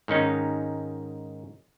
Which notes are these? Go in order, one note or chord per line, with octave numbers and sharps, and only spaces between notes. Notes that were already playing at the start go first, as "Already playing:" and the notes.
G#2 D#3 C#4 D#4